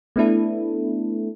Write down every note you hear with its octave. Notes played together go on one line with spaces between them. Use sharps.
A3 B3 D4 E4 A4